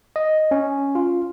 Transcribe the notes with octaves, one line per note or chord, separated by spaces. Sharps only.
D#5
C#4
F4